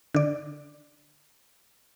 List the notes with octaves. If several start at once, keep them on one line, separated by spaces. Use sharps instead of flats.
D3 D5